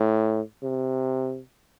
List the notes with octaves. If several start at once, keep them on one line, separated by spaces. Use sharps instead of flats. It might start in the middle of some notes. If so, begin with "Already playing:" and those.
Already playing: A2
C3